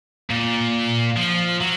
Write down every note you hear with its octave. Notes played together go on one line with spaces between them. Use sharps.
A#2
F3
F#3